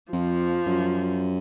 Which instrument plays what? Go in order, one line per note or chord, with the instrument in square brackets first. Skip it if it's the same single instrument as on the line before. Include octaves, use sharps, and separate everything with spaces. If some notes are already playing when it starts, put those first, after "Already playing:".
[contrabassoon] F2 [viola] F3
[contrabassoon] F#2